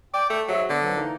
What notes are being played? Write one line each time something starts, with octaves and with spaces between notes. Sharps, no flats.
D5 G5
A3
G#2 F#3 E5
D3 B3
F2 B2 F#3
E3 A#3 D#4